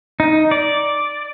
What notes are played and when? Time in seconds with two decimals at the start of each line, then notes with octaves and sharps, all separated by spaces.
0.20 D#4
0.51 D5